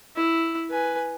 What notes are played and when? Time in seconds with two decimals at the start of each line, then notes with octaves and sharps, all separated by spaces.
0.16 E4
0.70 B4 G#5